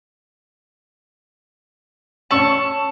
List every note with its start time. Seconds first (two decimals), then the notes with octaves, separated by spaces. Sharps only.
2.31 C#4 A5 C#6 E6 F#7